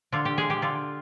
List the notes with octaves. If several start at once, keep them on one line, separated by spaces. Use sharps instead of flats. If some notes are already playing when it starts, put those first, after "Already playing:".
D3 F4
G4
G#3 G#4
G4
D3 F4